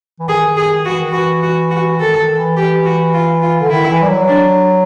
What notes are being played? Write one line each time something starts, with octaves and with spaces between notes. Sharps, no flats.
E3
D#3 G#4
G#4
E3 F#4
D#3
E3 F#4
F#4
F#4
D#3 A4
D#3
E3
E3 G4
F#4
F4
F4
D3
D#3 E4
E3
G3
F#3
D4